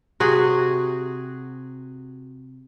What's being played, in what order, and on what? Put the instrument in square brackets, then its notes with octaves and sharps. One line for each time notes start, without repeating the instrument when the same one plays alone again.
[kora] C3 F#4 G#4